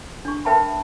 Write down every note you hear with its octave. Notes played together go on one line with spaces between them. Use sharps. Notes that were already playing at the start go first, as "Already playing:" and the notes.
D4 C#6
A#4 B4 E5 G5 A5 B5